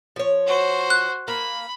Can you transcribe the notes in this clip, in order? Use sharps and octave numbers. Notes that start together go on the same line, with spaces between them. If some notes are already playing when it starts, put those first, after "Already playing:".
F3 C#5
F#4 C5
F#6
A#3 B5